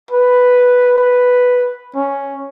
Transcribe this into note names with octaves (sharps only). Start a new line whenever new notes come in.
B4
B4
C#4